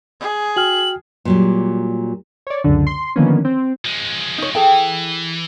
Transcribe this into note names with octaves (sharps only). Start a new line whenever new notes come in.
G#4
F#4 G5 F6 F#7
A#2 F#3 G3
C#5 D5
C#2 F#2 D3
C6
D3 D#3 F3 A#3 B3 C#4
C4
F3 G#3
D#4 C#5
E3 G#4 A4 G5